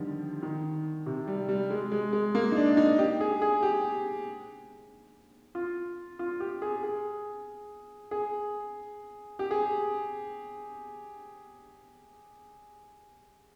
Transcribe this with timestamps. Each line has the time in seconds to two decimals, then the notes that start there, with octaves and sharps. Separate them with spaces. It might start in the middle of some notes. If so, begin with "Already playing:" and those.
Already playing: D3 D#3 F3 G3
0.43 D#3
1.06 C3
1.27 G3
1.49 G3
1.71 G#3
1.92 G#3
2.13 G#3
2.35 A#3
2.52 D#4
2.56 D4
2.77 D#4
2.99 G4
3.21 G#4
3.42 G#4
3.63 G4
5.55 F4
6.19 F4
6.40 G4
6.62 G#4
6.83 G#4
8.11 G#4
9.39 G4
9.51 G#4